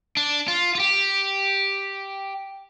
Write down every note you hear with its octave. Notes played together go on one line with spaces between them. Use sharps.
D4
F4
F4
G4